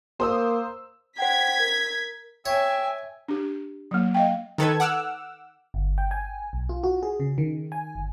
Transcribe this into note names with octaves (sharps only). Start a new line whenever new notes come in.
A#3 C5 D#6 E6
C5 F#5 G5 G#6 B6
A#4
C#5 E5 G5 G#5
D4 G4
F#3 A#3
D#5 F5 G5
D#3 A4 B4 G#6
F#5 D6 E6 F6
G1
G5
G#5
B1
F4
F#4
G#4
C#3
D#3
G#5
G1